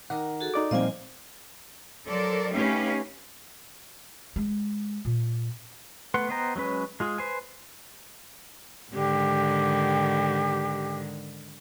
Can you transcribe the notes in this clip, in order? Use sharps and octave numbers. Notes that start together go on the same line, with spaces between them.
D#3 A#4 F#5 A#5 D6
F#4 G#4 A4
D#4 D5 D6
A#2 F3 G3 A#3 C4 D#5 F5 G#5
F#3 A4 A#4 C5 D5
A3 C#4 D#4 G4 B4 F5
G#3
A#2
A3 B3 B4 F#5 C6
B3 C5 D#5 G5 A#5
F#3 G#3 C#4 B4
G#3 F4 G#4
B4 C5 G#5
G#2 D3 D#3 G4